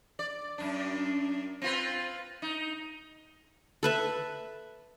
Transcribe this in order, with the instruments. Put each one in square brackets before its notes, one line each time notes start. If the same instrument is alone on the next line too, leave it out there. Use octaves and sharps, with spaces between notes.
[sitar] D5
F#2 D4
C4 F4 B4
D#4
[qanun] A4 B4 E5